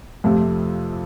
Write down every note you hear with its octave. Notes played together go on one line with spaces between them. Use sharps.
F2 C3 F3 A3